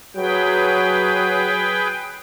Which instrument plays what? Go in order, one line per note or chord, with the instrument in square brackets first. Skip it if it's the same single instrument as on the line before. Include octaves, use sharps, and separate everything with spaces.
[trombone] F#3 [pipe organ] G#4 B4 G5